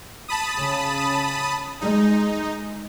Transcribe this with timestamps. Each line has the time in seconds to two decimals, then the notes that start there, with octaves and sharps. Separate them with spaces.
0.28 A5 B5 D#6
0.59 C#3
1.81 G#3 D#4